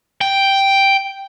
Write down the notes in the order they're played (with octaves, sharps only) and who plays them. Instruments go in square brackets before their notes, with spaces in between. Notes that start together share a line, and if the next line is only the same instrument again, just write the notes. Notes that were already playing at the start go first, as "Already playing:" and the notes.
[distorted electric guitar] G5